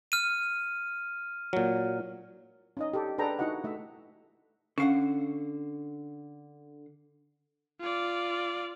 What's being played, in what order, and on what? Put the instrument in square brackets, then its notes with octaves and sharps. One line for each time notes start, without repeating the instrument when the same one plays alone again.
[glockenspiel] F6 D#7
[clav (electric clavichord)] A#2 F#3
[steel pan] C#4 D#4 D#5
G4 A4
D4 G#4 A4 B4 G5 A#5
D#4 E4 F#4 D#5 F#5
A3 E5
[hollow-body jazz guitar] D3 F5 F#5 [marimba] C#4
[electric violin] F4 D5